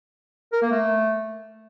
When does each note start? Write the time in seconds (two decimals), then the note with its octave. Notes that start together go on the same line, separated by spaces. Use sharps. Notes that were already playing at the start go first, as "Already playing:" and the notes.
0.53 A#4
0.62 A#3
0.71 A3